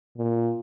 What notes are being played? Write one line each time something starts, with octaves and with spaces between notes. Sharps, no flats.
A#2